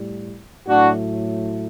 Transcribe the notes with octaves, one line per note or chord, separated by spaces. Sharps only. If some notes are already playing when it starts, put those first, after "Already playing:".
Already playing: A2 G3
A2 F#3 A3 D4 F#4